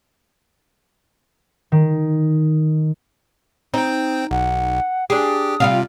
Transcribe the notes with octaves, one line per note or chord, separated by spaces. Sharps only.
D#3
C4 D#4 G5
B1 F#5
D4 G4 G#4 D#6
C3 G3 F4 F5